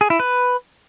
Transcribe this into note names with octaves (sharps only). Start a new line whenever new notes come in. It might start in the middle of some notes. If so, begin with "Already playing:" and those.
G#4
E4
B4